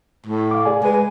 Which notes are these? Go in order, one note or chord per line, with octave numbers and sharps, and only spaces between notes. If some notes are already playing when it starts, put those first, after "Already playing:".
A2
F5 D6
G#4 D5 G#5
G#3 B4 G#5